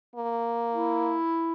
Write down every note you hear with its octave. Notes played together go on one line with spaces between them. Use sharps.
A#3
E4